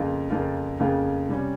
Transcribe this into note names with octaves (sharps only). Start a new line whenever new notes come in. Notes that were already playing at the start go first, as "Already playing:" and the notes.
Already playing: F2 C#3 F3 A#3 F4
F2 C#3 F3 A#3 F4
F2 C#3 F3 A#3 F4
C3 G3 C#4